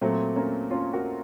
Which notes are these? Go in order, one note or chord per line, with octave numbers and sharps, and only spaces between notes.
A#2 F#3 A3 C4
A#3 C#4
C#4 F4
F#4 A#4